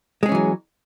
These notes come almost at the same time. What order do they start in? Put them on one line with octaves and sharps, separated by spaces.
G#3 G#4 C#4 E3 F#3